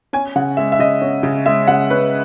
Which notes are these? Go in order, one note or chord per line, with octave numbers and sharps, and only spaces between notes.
C#4 G#5
C#3 F#5
G#3 E5
E5
C#3 D#5
C#4
C#3
G#3 E5
C#3 F#5
C#4 B4